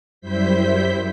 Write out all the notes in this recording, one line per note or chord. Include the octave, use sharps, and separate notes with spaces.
F#2 G3 E4 C5 G6 B6